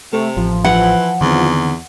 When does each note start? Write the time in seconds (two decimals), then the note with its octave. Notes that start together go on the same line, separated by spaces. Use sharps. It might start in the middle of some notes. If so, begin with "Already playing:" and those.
0.13 C3 A3
0.37 A1 F3
0.65 E3 F#5
1.21 E2 D3 D#3 C4